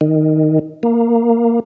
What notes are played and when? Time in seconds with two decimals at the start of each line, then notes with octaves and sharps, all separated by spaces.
0.01 D#3
0.83 A#3